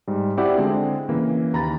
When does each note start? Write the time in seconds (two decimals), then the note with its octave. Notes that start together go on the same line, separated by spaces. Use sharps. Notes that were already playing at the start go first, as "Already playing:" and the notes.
0.07 G#2 G3
0.37 C4 E4 F#4 G4 D5 F#5
0.58 D3 G#3 C4
1.09 C#3 E3 A#3
1.53 D#2 A#5 B5 A6